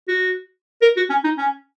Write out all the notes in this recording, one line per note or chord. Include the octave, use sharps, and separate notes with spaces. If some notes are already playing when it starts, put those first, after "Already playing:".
F#4
A#4
F#4
C#4
D#4
C#4